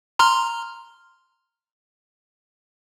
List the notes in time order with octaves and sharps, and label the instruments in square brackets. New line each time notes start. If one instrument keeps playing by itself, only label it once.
[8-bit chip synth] A#5 C6 F6